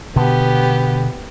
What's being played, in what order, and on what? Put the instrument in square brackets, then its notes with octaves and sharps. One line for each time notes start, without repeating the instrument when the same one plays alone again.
[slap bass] B2 D3 [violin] B3 G4